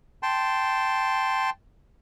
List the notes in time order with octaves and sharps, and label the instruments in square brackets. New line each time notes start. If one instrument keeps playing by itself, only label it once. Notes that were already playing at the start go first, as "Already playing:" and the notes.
[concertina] G5 A5 C6